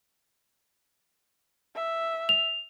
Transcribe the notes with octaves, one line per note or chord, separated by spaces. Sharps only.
E5
F7